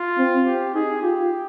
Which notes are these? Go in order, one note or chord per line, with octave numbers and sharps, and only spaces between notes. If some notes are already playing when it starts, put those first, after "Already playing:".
Already playing: F4
C4
G4
D#4 G#4
F4 G4